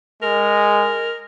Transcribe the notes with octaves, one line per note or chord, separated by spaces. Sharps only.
G#3 A#4